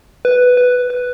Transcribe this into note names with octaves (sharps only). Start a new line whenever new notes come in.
B4
B4
B4